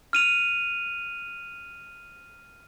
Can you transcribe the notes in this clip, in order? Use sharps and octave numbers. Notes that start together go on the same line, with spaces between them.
F6 D#7 F7